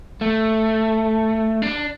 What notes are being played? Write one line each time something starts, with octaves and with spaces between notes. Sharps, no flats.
A3
D4